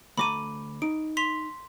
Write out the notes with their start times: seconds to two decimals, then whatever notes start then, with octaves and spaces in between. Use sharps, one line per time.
0.17 D2 A3 A#5 B5 D6 D#7
0.82 D#4 D7
1.17 C6 B6 F7